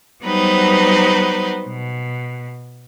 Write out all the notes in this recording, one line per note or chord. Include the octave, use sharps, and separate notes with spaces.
F#3 G3 B3 D#4 B4 C5
B2